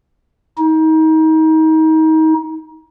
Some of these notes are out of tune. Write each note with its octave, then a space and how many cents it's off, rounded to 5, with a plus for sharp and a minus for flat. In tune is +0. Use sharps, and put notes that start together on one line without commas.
D#4 +30